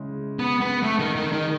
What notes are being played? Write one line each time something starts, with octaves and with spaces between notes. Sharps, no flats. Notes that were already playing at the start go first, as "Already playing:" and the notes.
Already playing: C#3 G#3 C#4 E4
B3
B3
A3
D#3
D#3
D#3